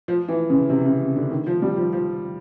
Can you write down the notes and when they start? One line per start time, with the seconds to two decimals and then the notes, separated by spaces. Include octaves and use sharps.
0.08 F3
0.28 E3
0.50 C#3
0.69 C3
0.85 C#3
1.16 D3
1.31 D#3
1.46 F3
1.62 G3
1.77 F3
1.93 F3